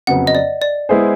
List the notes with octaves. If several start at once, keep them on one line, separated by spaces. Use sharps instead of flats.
F2 C#3 F#3 B3 F#5
D#5
D5
D5
G#3 B3 E4 G#4 C5